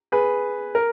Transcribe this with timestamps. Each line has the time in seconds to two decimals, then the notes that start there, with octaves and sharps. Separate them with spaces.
0.12 G#4 B4
0.75 A#4